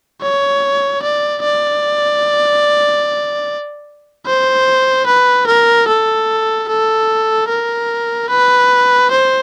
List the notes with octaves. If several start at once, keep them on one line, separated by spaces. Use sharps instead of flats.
C#5
D5
D5
C5
B4
A#4
A4
A4
A#4
B4
C5